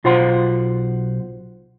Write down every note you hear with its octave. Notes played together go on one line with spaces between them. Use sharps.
B1 F4 C5 F#5 C6